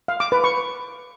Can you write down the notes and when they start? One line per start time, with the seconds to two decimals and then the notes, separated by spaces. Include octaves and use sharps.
0.08 F5
0.20 D6
0.32 B4
0.44 C#6